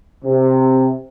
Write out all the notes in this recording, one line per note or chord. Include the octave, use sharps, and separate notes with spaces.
C3